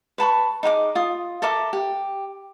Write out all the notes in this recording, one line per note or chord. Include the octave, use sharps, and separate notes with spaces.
B4 A5 B5 C#6
D#4 G#4 F#5 D6
F4 D#6
A4 A#4 E5 D6
G4